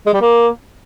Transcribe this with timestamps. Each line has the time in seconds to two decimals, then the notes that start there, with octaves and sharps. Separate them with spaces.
0.06 G#3
0.14 G3
0.21 A#3